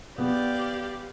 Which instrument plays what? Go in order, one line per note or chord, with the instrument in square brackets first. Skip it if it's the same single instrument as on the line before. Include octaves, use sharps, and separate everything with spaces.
[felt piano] B3 [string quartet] G4 D5 F5